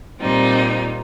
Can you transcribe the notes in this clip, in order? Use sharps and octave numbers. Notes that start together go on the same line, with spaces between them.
A#2 G3 C4 D#4